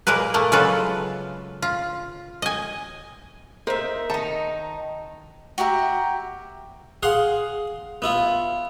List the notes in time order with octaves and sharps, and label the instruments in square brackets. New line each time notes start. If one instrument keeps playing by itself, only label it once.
[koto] A#2 G#3 A#3 A#4 B4
A3 A#3
C#3 F#3 G#3 F4 A4 B4
F4
D#5 G#5
[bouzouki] D#4 E5 [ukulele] A#4 C5
[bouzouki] D#3 D#4 [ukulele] A5
[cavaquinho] F#4 G4 E5 A#5
[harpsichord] G#4 F5 F#5 C6
B3 E4 F4